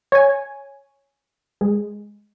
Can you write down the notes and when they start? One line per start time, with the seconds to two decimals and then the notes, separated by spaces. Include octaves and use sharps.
0.12 C#5 G#5
1.61 G#3